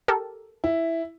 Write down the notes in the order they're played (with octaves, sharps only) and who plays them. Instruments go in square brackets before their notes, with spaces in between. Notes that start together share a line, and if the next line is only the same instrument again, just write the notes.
[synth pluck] G4 A4 A#4
[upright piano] E4